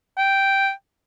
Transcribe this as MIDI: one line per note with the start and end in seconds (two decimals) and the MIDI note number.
0.17 0.71 79